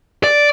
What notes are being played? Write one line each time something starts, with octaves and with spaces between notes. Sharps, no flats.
D5